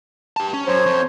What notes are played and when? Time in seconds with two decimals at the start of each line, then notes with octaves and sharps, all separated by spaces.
0.37 G4 A5
0.53 C#4
0.67 F#2 C5 C#5
0.86 F2